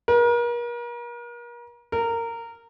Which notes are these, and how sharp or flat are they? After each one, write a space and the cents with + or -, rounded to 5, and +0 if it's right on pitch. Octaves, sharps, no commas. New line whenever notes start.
A#4 +40
A#4 -15